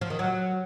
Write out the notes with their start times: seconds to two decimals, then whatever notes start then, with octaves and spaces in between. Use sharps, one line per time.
0.01 F3
0.10 D#3
0.19 F#3